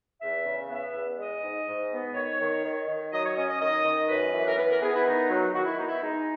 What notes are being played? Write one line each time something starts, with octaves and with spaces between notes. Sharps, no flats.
E2 E5
C#3
B3 E5
E2
G#3 D#5
G#2
G#2
B3
D#3 C#5
D#3
D#3
D#3
F#3 D#5
C#5
C#4 D#5
D#5
D#3 D#5
D#3
F#2 B4
E3
A#4
B3 B4
A#4
B3 G#4
E4
D#3 D#4
F#3
D#3 F#4
E4
B3 D#4
E4
G#3 D#4